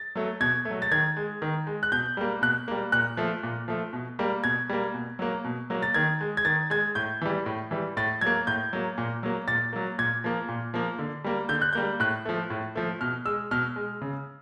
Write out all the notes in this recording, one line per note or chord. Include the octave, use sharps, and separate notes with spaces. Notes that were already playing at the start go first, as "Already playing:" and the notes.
Already playing: A6
F#3 A3
B2 G#6
A3
F#3
A6
D#3 G#6
G#3
D#3
G#3
F#6
B2 G6
G3 A#3
B2 F#6
G3 A#3
A#2 F#6
F3 A3
A#2
F3 A3
B2
G3 A#3
B2 G#6
G3 A#3
B2
F#3 A#3
B2
F#3 A#3
A6
D#3 G#6
G#3
G#6
D#3 A6
G#3 G#6
A2 G6
E3 G3
A2
E3 G3
A2 A6
F#3 A#3 G#6
A2 G6
F#3 A#3
A#2
F#3 A#3
A#2 A6
F#3 A#3
A#2 G#6
F3 A#3
A#2
F3 A#3
D3
G3 A#3
D3 G6
F#6
G3 A#3 G6
A2 F#6
F3 A3
A2
F3 A3
B2 F6
G#3 E6
B2 F6
G#3
C#3